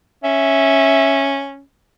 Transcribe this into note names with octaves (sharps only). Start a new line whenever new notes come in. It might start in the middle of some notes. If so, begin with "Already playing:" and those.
C#4 E5